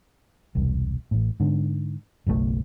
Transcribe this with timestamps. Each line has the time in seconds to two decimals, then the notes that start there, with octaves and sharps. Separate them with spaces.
0.55 E1 C2
1.11 A1 A2
1.40 G#2 D3
2.27 F#1 B1 C3 A3